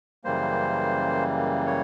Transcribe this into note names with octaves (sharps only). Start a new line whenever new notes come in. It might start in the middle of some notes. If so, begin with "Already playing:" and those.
F#2 C#3 E3 G3 A#3 C5
C#5